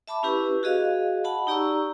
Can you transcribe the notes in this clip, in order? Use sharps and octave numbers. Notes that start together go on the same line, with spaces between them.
E5 A5 B5 D6
C#4 E4 G4 B4
F#4 G#4 D#5 F5
F#5 A5 B5
D#4 G4 D5 A#5 C#6 E6